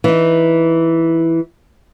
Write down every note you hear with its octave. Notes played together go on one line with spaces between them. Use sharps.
E3 D#4